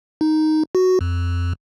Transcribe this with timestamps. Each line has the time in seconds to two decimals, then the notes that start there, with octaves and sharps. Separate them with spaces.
0.21 D#4
0.75 F#4
1.01 F2